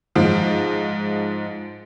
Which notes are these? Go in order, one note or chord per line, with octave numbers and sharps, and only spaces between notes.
G#2 F3